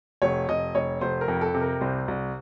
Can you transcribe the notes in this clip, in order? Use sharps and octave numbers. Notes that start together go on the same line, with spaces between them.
F1 C#5
F1 D#5
F1 C#5
F1 C5
A#4
F2
A4
C3
A#4
C2 C5
C2